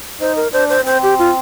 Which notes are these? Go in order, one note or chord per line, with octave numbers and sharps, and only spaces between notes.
D#4 C5
A#4
D4 C5
C5
C4 C5
G4
F4